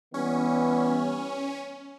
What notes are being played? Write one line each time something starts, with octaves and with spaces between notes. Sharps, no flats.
E3 G3 B3 C#4